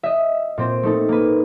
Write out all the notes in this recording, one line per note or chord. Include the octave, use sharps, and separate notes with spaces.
D#5 E5
A#2 C4 C5
A3 D#4 A4
A#3 B4